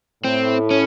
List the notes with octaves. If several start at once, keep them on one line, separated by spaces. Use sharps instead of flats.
A2 C4
C#4